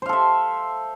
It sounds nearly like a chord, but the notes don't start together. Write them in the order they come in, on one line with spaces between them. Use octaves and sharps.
C5 F5 A4 E5